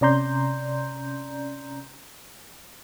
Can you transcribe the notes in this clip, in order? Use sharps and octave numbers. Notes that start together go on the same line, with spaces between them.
C3 C#4 D5 A#5 C6 G6